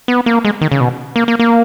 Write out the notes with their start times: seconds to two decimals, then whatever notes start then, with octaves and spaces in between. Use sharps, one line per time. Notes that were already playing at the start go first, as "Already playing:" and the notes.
0.08 B3
0.26 A#3
0.45 G#3
0.61 D#3
0.72 C#3
0.80 B2
1.16 A#3
1.28 A#3
1.39 A#3